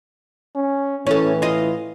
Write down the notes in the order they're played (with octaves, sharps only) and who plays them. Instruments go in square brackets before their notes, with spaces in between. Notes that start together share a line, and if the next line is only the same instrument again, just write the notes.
[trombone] C#4
[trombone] A2 [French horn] E3 [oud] C#4 A4
[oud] F4 D#5